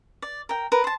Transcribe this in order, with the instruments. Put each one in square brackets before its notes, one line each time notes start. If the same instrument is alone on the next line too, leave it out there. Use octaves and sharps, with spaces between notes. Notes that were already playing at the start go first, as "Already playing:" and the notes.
[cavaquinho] D5
A#4 G5
A#4 B4
C5 A5